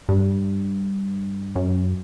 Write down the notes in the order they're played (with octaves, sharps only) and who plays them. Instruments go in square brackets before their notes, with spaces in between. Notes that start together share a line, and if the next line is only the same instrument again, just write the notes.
[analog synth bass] G2
F#2